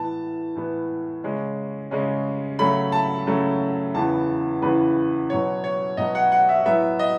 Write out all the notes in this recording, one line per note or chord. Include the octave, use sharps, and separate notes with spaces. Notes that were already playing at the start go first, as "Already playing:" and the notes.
Already playing: A2 E3 B3 A5
A2 E3 B3
C#3 G#3 C#4
C#3 G#3 C#4
C#3 F#3 A3 C#4 B5
A5
C#3 F#3 A3 C#4
E2 C#3 E3 B3 A5
E2 C#3 E3 B3 B4
B2 F#3 B3 C#5
C#5
B2 F#3 B3 D#5
F#5
F#5
E5
A2 F#3 B3 E5
D#5